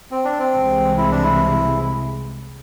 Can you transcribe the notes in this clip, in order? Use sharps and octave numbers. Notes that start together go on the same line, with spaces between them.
C4
D4
C4
C2 C3 E3 G#3
E4
D4
E4